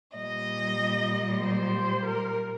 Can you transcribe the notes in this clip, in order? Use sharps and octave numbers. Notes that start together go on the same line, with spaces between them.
A#2 G3 D#5
C5
A#4